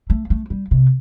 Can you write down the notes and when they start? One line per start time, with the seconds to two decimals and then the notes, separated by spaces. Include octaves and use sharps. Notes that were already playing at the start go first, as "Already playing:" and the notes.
0.10 A3
0.30 A3
0.50 G3
0.71 C3